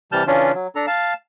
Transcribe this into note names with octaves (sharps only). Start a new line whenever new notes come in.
C3 E3 G3 A5 F6 G6
C#3 E3 C#4 D4 F4
F#3
D4 A4 A#5
F5 A5